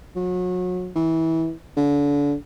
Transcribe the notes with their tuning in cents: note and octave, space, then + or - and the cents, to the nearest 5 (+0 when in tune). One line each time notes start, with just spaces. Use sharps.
F#3 -30
E3 -25
D3 -30